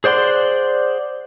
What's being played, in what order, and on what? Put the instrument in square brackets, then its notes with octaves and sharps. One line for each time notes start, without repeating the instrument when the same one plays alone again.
[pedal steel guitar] G#4 C5 D5 F#5 C6